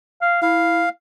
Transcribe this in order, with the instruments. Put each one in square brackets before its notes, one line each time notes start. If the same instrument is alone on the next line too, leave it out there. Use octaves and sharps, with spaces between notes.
[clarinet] F5
[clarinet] E4 [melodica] F5